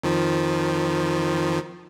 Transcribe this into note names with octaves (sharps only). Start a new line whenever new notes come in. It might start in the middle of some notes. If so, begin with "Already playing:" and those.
F2 D#3 F3